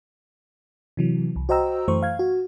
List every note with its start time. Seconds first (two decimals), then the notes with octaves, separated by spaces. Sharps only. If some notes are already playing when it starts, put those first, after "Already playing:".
0.97 C3 E3 F#3
1.36 C2
1.49 F#4 C5 D#5 G5 A#5 E6
1.88 F#2 E3 A3 C5 C#6
2.03 F5 G#6
2.19 F#4